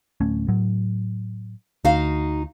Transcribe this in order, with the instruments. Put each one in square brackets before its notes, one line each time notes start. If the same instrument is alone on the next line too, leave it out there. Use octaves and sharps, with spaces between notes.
[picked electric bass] D1 A3 C#4
A2 F#3
[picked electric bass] D2 [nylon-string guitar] D#4 F#4 F5